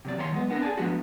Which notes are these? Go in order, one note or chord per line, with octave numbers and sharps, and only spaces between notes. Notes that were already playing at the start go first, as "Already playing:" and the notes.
C3 F#3 D5
D#3 C#5 D5 C6
F#3 G#3 B3
B3 C4 D4 G4 A#4 B4
G#4 C5 D5 G#5 A5
F3 G#3 A3 B3 D4 F#4